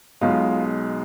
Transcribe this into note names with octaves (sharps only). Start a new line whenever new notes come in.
B1 B2 G#3 F4